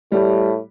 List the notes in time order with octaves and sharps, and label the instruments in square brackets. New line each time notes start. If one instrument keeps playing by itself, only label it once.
[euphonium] A2 [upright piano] G3